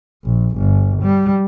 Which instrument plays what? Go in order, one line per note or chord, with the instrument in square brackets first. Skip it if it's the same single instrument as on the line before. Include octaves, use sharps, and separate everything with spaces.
[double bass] A#1
G1
G3